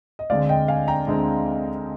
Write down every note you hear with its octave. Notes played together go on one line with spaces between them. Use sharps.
D#5
D2 D3 G#3 C4 D5 F5
D#5 G5
F5 G#5
G5 A#5
D2 D3 G#3 C4